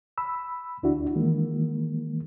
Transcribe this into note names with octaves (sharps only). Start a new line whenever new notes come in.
B5 E6
D2 D4 E4 F#4
D#3 E3 G#3 A#3